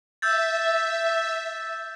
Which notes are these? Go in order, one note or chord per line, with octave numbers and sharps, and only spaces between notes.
E5 E6 G6 A6